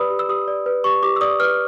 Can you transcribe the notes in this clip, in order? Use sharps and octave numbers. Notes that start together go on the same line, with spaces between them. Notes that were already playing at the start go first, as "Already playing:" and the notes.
Already playing: G4 B4 D5 B5 D#6 E6
G4
E6
G4 D#6
D5
B4
G4 C#6
G4 D6
E6
D5 D#6
B4 F6